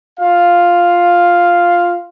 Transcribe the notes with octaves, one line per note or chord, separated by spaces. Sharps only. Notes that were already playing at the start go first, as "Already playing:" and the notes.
F4 F5